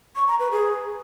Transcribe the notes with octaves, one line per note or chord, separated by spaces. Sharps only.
C#6
A#5
B4
G#4